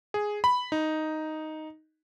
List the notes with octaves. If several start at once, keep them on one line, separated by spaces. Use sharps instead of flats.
G#4
B5
D#4